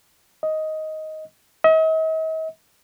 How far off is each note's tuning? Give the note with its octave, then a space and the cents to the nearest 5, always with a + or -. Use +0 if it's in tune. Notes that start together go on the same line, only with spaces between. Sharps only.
D#5 +10
D#5 +45